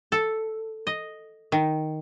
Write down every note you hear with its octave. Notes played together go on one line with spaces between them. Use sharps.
A4
D#5
D#3